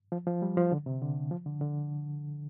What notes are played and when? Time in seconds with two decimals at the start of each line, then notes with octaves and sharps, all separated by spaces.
0.12 F3
0.27 F3
0.42 G3
0.57 F3
0.72 D3
0.86 C3
1.01 D3
1.31 F3
1.46 D3
1.61 D3